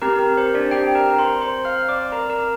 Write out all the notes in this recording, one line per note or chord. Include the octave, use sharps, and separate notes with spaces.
C4 G4 A#4 A#5
A#4
C5
D4 D5
G4 G5
A#4 A#5
A#5
C5 C6
C5 C6
F5 F6
D5 D6
A#4 A#5
A#4 A#5